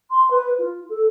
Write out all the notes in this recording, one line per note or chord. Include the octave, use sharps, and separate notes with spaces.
C6
B4
F4
A4